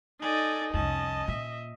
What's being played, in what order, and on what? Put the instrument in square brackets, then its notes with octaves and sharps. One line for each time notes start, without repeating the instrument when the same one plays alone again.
[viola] D#4 A4 [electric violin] D5 G#5
[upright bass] C2 F2 [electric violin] C#4 A5 [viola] D#5
[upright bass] A#2 [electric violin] E5